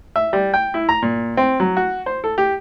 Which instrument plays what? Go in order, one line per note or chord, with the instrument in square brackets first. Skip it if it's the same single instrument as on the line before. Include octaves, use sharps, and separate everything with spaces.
[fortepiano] E5
G3
G5
E4
A#5
A#2
C4
F#3
F#4
C5
A4
G4